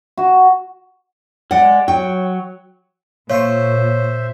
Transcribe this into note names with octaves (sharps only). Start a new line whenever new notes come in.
F#4
G#3 D5 F#5
F#3 C#5 G5
A#2 F4 C5 C#5 E5 C6 C#6